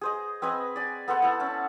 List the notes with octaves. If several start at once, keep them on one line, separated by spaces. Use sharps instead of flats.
G#4 C5 D#5
C4 B4 D#5 G#5
D5 G#5
B3 A4 C5 F#5
E4 A4
C#4 E5 A5